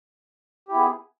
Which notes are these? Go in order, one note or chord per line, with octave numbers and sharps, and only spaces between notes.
B3 E4 G4 G#4